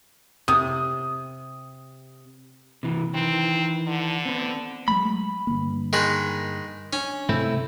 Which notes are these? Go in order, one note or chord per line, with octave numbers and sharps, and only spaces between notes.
C3 D#6
C3 E3
D#3 E3 C4
D3
B3 C4
F#3 G#3 A3 B5
G2 D3 A#3
D#3 G#3 B4
C#4 D4
G#2 C3 A3 C4 E4